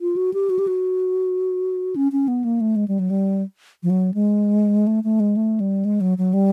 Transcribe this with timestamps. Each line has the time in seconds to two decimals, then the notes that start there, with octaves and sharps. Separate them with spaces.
0.01 F4
0.16 F#4
0.34 G4
0.50 F#4
0.59 G4
0.67 F#4
1.96 C#4
2.12 C#4
2.28 B3
2.44 A#3
2.61 A3
2.76 G#3
2.88 G3
2.99 F#3
3.10 G3
3.83 F3
3.90 F#3
4.14 G#3
4.87 A3
5.04 A3
5.20 G#3
5.36 A3
5.60 G3
5.85 G#3
6.01 F#3
6.18 F#3
6.34 G3